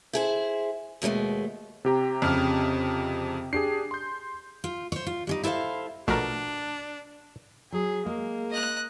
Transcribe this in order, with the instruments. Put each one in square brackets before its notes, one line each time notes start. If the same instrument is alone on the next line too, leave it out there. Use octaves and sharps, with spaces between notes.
[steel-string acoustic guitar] E4 G#4 C5
D#2 B2 F#3 G#3 A3
[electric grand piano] C3 G4 A#5
[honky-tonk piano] F2 C#3 F6
[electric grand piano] D4 G4 G#4 [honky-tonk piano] C7
[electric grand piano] C6 G6
[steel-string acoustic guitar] F4
C5 C#5
F4
G3 C#4 D#4
E4 A4 C5 C#5 F5
[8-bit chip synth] A#1 F3 A3 [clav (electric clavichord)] B2 A#4 [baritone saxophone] D4
[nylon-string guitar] F#3 [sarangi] G#4
[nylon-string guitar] G#3 [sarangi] A#3
[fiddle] D#5 F#6